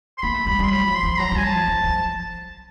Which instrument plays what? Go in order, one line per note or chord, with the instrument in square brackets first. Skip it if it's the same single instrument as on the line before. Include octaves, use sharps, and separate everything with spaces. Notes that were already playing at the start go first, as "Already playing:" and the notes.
[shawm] C6
[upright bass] A#3 [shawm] B5
[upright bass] A3
[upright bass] G3 [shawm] B5
[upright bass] G3 [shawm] C6
[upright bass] F#3 [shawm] B5
[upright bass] F3
[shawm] C6
[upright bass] F3
[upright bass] F#3 [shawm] A#5
[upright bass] G3
[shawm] G#5
[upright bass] F#3 [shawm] A5
[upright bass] F3
F3
F3